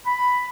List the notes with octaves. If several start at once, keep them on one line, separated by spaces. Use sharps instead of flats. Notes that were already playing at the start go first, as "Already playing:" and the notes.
B5